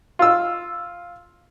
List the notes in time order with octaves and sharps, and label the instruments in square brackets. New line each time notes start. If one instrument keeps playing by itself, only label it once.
[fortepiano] F4 E6